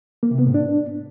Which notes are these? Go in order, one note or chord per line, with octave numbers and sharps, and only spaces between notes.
A#3
C3
B3
G#2
D4